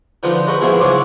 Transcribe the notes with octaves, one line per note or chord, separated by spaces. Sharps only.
D3 F3 B3 D#4 F4
F#4 A4 B4 C5 D#5
G#2 B2 F3 B3 E4 G#4
C#2 G#2 F#3 F#4 C6 D6